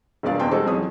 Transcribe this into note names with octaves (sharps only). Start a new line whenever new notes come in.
E1 G2 A#2 D5 F5
F#1 E2 B2 D4 G5 C6
G3 G#3 F#4 A4 C5
F2 E3 F#3 C#4 G#4 D#6